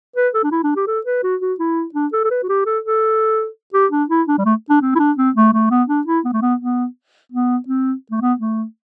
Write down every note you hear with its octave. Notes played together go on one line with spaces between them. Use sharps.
B4
A4
D4
E4
D4
G4
A4
B4
F#4
F#4
E4
D4
A4
A4
B4
F#4
G4
A4
A4
G4
D4
E4
D4
G3
A3
D4
C4
E4
D4
C4
A3
A3
B3
D4
E4
B3
A3
B3
B3
B3
C4
A3
B3
A3